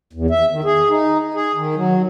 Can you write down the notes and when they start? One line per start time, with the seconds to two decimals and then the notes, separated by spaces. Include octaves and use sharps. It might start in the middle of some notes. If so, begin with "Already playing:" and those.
0.13 E2
0.31 E5
0.51 D#3
0.64 G#4
0.90 D#4
1.34 G#4
1.56 D#3
1.75 F#3